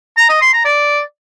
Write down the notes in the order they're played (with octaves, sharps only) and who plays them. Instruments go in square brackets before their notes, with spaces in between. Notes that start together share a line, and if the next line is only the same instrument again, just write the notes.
[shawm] A#5
D#5
C6
A#5
D5